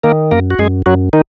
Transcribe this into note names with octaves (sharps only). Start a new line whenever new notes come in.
D#3 A#3 A#4
F#2 A#3 A#4
F#4
F#2 G#3 G#4
F#2 F#3 F#4
D#3 D#4